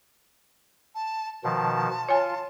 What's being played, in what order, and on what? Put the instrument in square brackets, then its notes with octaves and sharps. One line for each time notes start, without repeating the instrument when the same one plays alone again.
[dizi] A5
[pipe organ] B2 D#3 F3 [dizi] A5
[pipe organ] F4 [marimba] C#5 G#5